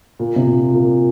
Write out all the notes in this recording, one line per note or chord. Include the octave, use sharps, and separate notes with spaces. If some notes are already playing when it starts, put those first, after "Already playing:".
A#2
C3
A#2
A#2